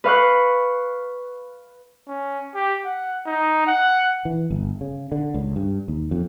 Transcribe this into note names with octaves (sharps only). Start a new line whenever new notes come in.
B4 F5 C#6 F#6
C#4
G4
F#5
D#4
F#5
E3
G1
C#3
D3
C#2
G2
D#2
F2